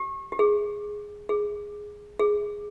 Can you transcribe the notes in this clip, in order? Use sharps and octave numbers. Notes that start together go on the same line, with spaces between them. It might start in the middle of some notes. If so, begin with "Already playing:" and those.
Already playing: G4
G4
G#4
G#4
G#4